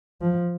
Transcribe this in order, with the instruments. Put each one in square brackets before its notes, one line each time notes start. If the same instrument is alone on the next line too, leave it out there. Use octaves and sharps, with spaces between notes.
[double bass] F3